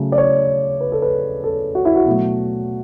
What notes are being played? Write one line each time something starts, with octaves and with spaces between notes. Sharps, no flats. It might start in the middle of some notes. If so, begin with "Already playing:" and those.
Already playing: C#3 F#3 A3
D5
C#5
B4
A4
B4
A4
F#4
E4
F#4
B2 F#3 A3